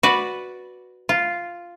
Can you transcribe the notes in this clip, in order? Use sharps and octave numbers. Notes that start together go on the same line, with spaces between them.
F#4 B4 D5
F4